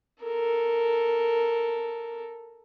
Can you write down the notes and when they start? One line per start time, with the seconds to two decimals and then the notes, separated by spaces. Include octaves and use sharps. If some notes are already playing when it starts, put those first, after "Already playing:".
0.23 A4 A#4